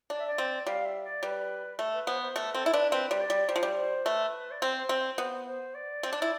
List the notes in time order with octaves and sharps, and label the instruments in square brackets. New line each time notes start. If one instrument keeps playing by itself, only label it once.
[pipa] D4 [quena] D5
[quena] E5
D5
[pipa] C4
[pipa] G3 [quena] F5
[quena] E5
D5
[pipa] G3 [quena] B4
[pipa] A3
[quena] B4
[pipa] B3 [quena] C5
[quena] C5
[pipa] A3 [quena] B4
[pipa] C4 [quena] A4
[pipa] E4
[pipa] D4 [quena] B4
[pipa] C4 [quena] B4
[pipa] G3
[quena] D5
[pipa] G3
[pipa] G3 [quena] C5
[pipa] F3
G3
[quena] C5
[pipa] A3 [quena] B4
[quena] D5
[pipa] C4 [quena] C5
[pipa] C4
[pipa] B3 [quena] C5
[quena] C5
D5
[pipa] C4
D4
E4